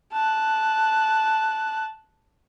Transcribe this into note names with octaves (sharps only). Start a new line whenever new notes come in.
A5 F#6